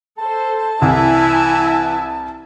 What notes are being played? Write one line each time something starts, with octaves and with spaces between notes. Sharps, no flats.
A4 C5 A5
C2 E3 E4 E5 G#5